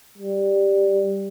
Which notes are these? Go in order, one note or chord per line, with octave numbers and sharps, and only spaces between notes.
G3